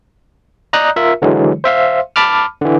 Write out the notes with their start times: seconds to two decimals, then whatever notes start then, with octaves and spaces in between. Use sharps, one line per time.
0.73 D5 D#5 A#5 D#6 F#6 G6
0.96 F4 A#4 E5
1.22 D3 E3 F#3 G#3
1.64 C5 E5 F5 C6
2.16 A5 B5 D6 F6
2.61 D3 E3